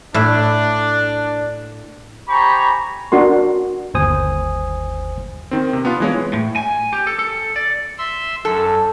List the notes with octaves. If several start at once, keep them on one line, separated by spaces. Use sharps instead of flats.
A2 D4 E5
G4 C5 G#5 A#5 B5 C#6
D4 F#4 A#4 C6
G1 D#2 C5 G#5 D#6
D#3 C4
C3
B3 D4 F4
E3 G#3 C#5
A2
G#5
G4
A4
A4
D5
E5 C6 E6
F#2 A4